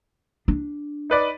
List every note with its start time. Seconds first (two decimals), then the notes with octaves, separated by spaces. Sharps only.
0.48 D4
1.10 D#4 B4 D5